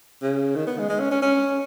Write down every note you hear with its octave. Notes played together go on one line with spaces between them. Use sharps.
C#3
D#3
B3
G#3
G#3
C#4
C#4
C#4